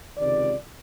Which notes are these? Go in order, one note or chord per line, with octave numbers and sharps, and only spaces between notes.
C#2 C3 D#3 D5